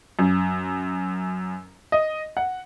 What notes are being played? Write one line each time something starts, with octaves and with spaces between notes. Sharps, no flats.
F#2
D#5
F#5